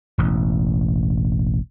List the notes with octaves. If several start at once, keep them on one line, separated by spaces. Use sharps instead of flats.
E1 A1